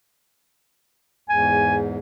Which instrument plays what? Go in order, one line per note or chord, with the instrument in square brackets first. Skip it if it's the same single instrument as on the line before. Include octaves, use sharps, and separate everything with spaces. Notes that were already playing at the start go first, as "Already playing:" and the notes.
[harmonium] E2 G#2 [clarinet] G#5